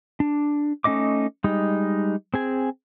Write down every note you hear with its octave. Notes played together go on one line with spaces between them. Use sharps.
D4
A3 C#4 D#4 D#5 D6
G3 G#3 D#4
C4 G#4 G#5